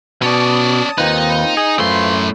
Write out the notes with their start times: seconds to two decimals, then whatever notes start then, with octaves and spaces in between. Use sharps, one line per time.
0.22 B2 C#4 D5 A5 D#6
0.98 D#2 A#3 C4 D#4 F4 B4
1.57 G#4
1.78 F#2 A2 A3 F4 B4 C5 C6